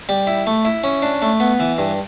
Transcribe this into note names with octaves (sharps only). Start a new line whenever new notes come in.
G3
E4
A3
E4
C#4
D4
A3
B3
E3
G2